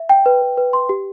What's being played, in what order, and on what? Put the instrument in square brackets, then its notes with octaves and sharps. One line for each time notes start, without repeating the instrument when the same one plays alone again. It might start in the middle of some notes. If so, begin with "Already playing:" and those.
Already playing: [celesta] E5
G5
B4
B4
B4
C6
G4